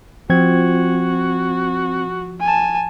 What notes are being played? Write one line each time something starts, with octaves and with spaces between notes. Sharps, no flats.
F3 C4 F#4 G#6
G#5 A5